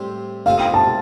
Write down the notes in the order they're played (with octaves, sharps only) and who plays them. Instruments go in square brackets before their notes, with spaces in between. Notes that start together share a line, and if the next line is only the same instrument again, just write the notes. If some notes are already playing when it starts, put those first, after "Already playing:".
Already playing: [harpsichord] A2 G3 C4 G4
[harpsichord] C3 A3 C4 F4 [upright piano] F5
[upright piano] G5
A5